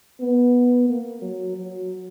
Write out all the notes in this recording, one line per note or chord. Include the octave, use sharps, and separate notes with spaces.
B3
A#3
F#3
F#3